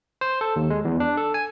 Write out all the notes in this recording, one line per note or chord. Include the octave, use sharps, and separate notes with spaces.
C5
A4
D#2
G#3
E2
D4
A4
G#5